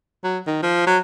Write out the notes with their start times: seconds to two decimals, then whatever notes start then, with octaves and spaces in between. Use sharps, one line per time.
0.24 F#3
0.47 D#3
0.62 F3
0.87 F#3